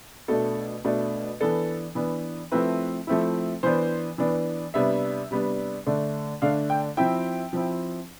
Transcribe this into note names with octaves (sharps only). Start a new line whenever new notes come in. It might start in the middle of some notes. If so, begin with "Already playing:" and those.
B2 A3 D4 A4
B2 A3 D4
E3 B3 D4 A4
E3 B3 D4
F3 A3 C4 E4 B4
F3 A3 C4 E4
E3 B3 D4 C5
E3 B3 D4
C3 G3 B3 D4 E5
C3 G3 B3 D4
D3 A3 D4
D3 A3 D4 F5
G5
F3 C4 E4 G5
F3 C4 E4